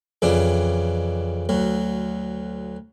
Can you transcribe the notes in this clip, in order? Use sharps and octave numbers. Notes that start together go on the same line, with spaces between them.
F2 C#3 E3 D4
D2 F#3